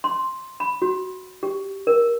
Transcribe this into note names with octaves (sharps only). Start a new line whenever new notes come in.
C6
B5
F#4
G4
A#4